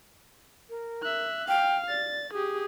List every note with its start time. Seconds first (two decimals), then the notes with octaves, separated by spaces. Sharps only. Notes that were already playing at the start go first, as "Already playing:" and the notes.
0.69 A#4
1.02 E5 F#6
1.48 F5 G5
1.88 D5 A6
2.33 G4 G#4 D#6